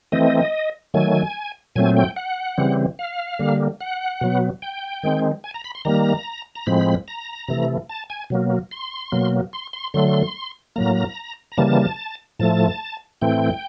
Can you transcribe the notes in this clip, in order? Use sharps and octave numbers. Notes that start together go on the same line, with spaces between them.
E3 A3 C4 D#5
D#3 F#3 A3 G#5
A#2 F#3 A3 C4 G#5
G5
F#5
C#3 E3 G3 C4
F5
D3 G3 A#3
F#5
B2 F#3 B3
G5
D#3 G#3 C4
G#5
A#5
B5
C6
D#3 G3 A#3 A#5
A#5
A2 F3 G#3 C4 B5
A#5
C3 E3 A3
A5
G#5
B2 F#3 A#3
C6
B2 F#3 A#3
C6
C6
D3 F#3 A3 C6
A2 F#3 A#3 A#5
A#5
C#3 E3 G3 A#3 A5
A2 F3 A3 A5
A2 E3 A3 C4 G5